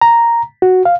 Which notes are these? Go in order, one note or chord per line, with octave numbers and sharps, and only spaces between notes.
A#5
F#4
F5